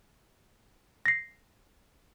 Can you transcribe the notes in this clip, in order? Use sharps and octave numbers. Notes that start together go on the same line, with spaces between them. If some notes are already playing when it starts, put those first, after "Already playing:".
A#6 C7